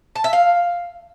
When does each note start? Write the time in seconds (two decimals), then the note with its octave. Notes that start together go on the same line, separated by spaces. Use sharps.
0.16 A5
0.24 E5
0.33 F5